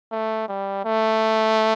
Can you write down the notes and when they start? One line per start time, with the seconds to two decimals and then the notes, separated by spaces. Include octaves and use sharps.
0.12 A3
0.48 G3
0.85 A3